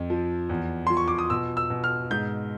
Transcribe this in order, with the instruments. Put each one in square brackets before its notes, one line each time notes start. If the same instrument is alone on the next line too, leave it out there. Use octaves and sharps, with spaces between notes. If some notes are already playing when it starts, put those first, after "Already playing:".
Already playing: [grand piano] F2
F3
E2
F3 C6
C#6
D6
D#6
B2 E6
E6
B2
F6
G#2 G6